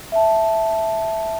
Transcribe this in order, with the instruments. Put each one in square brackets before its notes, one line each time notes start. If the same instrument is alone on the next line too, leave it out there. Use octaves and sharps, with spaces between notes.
[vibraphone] E5 A5